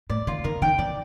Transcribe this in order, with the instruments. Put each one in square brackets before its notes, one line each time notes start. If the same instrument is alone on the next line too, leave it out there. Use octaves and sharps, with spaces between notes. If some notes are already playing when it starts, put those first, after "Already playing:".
[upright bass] A2 [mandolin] D5
[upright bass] D#3 [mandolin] F4
[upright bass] D#3 [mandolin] A#4
[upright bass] D#3 [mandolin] G5
[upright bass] E3 [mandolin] D5